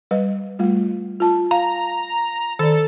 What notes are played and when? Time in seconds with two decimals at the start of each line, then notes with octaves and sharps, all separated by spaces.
0.11 G3 B4 D#5
0.59 G3 A3 F4
1.20 F4 A5
1.51 F5 A#5
2.59 D#3 A4 D5